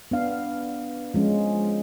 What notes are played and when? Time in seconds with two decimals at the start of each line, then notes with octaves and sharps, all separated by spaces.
0.11 B3 D4 F5
1.14 F3 G#3 C#4